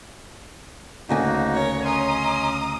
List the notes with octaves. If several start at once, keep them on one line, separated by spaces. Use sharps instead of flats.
D2 C#3 A#3 D#4 F#4 G#5
A#4 C#5 A#6
C#4 D#5 A#5 C6 D#6